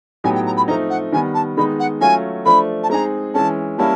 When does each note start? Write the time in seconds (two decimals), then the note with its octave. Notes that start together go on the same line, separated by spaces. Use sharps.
0.24 A2 F#3 B3 D#4 G4 G#5
0.35 G5
0.46 A#5
0.57 B5
0.68 F3 A3 C4 D#4 A#5
0.90 F#5
1.12 D#3 G3 B3 G#5
1.34 A5
1.57 D#3 G#3 B3 D#4 B5
1.80 F#5
2.01 F#3 A3 C#4 F4 G#5
2.45 F3 A3 D4 B5
2.83 A5
2.90 G#3 C4 D#4 G#4 A#5
3.34 E3 G#3 C#4 A5
3.78 G3 A#3 C#4 E4 A5